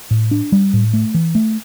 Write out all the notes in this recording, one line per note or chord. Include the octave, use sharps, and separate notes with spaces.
A2
D4
G3
A2
A3
E3
A3